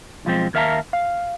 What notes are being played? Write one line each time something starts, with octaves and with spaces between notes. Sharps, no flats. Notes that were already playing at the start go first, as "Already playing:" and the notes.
B1 F3 G#3 C4
D#2 A#4 E5 F5 A5 A#5
F5